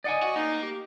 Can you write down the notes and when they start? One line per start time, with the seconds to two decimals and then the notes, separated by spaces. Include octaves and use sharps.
0.04 D5 D#5 F#5 G#5
0.22 F#4
0.36 A#3 D#4
0.63 G4